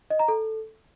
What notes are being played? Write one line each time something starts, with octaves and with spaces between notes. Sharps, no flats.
D#5
A#5
A4